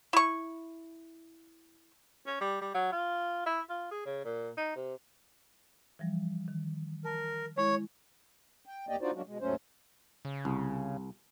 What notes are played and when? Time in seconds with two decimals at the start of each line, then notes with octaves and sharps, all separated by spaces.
0.13 E4 C#6
2.27 C#4
2.41 G3
2.61 G3
2.74 F#3
2.92 F4
3.46 E4
3.69 F4
3.91 G#4
4.06 C#3
4.25 A#2
4.57 D#4
4.75 C3
5.99 E3 F3 G3
6.48 D#3
7.05 A#4 A5
7.58 G#3 E4 C#5
8.65 G5
8.89 D#2 A#3 G4 D5 D#5 G5
9.01 D4 D#4 F4 F#4 C5 D5
9.14 F#3 G#3 A#3 C#4 D4 F#4
9.26 B2 G#3
9.41 D#2 G#2 F#3 A3 C#4 C5
10.25 C#3
10.45 C2